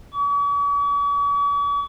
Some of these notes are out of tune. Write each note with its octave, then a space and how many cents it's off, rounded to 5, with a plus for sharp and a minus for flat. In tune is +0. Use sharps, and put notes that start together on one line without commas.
C#6 +45